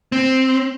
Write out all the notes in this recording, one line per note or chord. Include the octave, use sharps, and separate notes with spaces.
C4